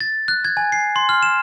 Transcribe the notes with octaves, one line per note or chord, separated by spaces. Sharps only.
A6
F#6
G#6
G#5
C7
C6
F6
E7